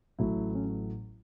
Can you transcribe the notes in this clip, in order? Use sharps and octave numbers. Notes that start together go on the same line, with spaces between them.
A1 A2 F#3 A3 E4
C#4